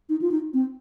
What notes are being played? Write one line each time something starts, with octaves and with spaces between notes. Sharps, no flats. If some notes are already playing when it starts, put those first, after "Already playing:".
D#4
F4
D#4
C4